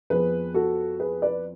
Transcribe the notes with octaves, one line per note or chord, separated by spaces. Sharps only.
F2 F3 B3 G#4 B4
F#4 A4
G#4 B4
B4 D5